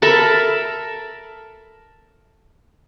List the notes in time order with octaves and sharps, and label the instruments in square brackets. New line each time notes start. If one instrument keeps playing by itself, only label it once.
[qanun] A4 A#4 E5 B5